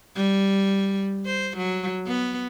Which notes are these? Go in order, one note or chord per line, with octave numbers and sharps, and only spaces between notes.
G3
C5
F#3
B3